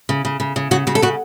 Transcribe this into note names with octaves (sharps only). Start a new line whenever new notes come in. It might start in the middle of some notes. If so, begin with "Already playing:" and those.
C#3
C#3
C#3
C#3
C#3 F#4
C#3 F#4
A4
C#3 F#4